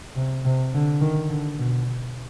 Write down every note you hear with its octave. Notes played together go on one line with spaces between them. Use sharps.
C3
C3
D3
D#3
D3
B2